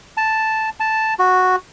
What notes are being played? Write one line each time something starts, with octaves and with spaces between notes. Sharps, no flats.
A5
A5
F#4